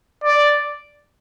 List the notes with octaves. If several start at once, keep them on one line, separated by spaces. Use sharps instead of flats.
D5